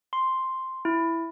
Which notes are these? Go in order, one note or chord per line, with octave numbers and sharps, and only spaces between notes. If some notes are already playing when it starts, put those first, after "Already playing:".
C6
E4